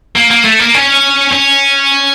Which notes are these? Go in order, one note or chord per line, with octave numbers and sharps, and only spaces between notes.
A#3
A#3
A3
A#3
C#4
C#4